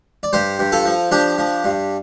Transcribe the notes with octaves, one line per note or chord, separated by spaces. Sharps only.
D5
G2 G4 C5
G2
F4 A4
F3
F3 D4 G4
F3
G2